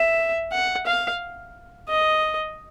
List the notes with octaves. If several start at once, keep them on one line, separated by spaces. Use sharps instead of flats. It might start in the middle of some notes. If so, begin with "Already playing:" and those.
Already playing: E5
F#5
F5
D#5